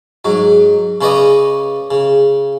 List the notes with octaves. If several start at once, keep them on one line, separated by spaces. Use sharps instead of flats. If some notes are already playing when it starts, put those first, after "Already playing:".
G#2 F#3
C#3 C#4 B4 D5 D#5 D#6
C#3